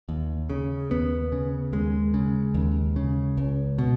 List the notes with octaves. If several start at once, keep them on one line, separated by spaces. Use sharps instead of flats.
D#2
C#3
D#2 B3
C#3
D#2 G#3
C#3
D#2
C#3
C#2
B2